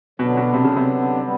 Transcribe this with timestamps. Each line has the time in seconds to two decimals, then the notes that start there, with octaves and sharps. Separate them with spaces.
0.19 B2 D3 F#3 B3 D4
0.37 B2
0.54 C3
0.64 C#3
0.77 C3
1.22 G3 B3